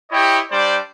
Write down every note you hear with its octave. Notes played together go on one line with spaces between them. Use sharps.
E4 G4 C#5 D#5 G5
G3 D4 C5 D5